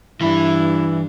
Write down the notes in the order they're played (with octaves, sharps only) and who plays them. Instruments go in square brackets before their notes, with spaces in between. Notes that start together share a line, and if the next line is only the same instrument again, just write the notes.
[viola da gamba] G2 D4 [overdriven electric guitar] E3 B5 [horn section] E4